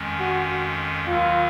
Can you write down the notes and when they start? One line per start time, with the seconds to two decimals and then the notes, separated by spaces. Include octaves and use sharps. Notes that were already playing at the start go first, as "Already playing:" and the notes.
Already playing: F2 D#3 G#3 C#4
0.20 F#4
1.07 D#2 D#3 F#3 F4